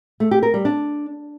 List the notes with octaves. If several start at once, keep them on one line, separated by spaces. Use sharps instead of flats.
A3
G4
A#4
G3
D4